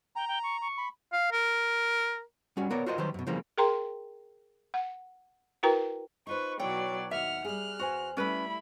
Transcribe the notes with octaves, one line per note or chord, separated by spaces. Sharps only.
G5 A#5
G5
C#6
C#6
B5
F5
A#4
G3 C#4 F#4
B3 A#4 C#5 D5
F4 F#4 A#4 C5 D5 D#5
D#3 F#3 G3 B4 C5
F#2 B2
C#3 E3 F3 G3 A#3 C4
G#4 A#4 G5 A#5 C6
F#5
E4 F#4 A#4 B4 G5 A#5
D#4 F4 B4 C5 C#6
B2 F#3 E4 C#5 D5 G5
D#2 A#3 E5 F#5 F6
G3 G#4 F6 F#6
E2 F#4 C5 G#5
G3 A3 C#4 E4 B4 B5